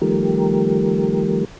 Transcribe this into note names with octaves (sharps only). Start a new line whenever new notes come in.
D#3 F3 G3 A3 G4 A#4